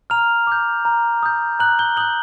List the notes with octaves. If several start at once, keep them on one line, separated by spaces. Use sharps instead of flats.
A#5 F6 F7
D6 G6
A#5
D#6 G6
A#5 F#6 F#7
G6 G7
D#6 F#6 G6 F#7